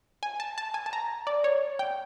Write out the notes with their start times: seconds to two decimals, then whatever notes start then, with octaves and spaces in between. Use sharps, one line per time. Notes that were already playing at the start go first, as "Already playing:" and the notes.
0.23 G#5
0.40 A5
0.58 A5
0.74 G#5
0.86 A5
0.93 A#5
1.27 D5
1.44 C#5
1.79 G5